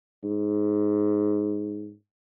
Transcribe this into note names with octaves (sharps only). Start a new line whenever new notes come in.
G#2